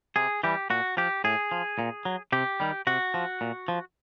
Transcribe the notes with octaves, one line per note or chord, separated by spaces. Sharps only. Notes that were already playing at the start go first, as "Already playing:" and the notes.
C3 G#4
E3 G3 G4
A#2 F#4
F3 G4
A2 G#4
F3
A#2
F#3
C3 G4
D#3 G3
C3 F#4
F3
A#2
F3